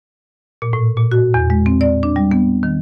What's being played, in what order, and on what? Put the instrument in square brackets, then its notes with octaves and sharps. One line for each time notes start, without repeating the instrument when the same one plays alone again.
[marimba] A#2
A2
A#2
F#4
E2
G#3
C4
D5
D4
G3
B3
D#3